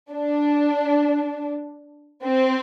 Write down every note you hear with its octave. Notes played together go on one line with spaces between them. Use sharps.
D4
C4